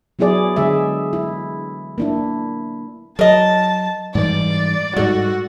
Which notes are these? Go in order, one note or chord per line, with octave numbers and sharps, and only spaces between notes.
F#3 B3 E4 G#4 D5
D3 G#3 G#4 E5
E4
A#3 D4 E4
F#3 A#4 D#5 A5
G#2 E3 G3 D5
G#2 G3 F#4 A4 D5